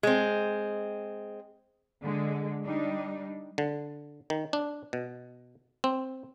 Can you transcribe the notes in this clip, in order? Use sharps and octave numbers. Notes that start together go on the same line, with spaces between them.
G#3 C4
D3 G#3
G3 D4 D#4
D3
D#3
D4
B2
C4